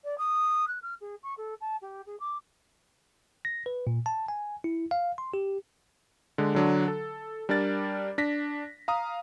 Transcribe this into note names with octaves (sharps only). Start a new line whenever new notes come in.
D5
D#6
F#6
F6
G#4
C#6
A4
A5
G4
G#4
D6
A#6
B4
A#2
A5
G#5
E4
F5
C6
G4
D3 G#3
D3 F#3 D4
A4
G3 D4 A#4 D5 A6
D4 A#6 B6
F5 A#5 D#6